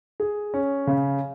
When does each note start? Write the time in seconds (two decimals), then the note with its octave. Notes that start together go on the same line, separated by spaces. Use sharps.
0.20 G#4
0.54 C#4
0.87 C#3